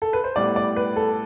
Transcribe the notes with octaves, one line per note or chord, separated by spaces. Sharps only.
A4
B4
C5
A2 G3 B3 D5
D5
B4
A4